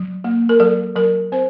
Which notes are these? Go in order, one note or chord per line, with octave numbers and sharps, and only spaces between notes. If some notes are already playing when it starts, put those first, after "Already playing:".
Already playing: F#3
A#3
A#4
F#3 A4
F#3 A#4
C4 C5